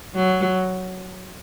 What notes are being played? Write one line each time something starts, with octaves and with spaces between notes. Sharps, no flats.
F#3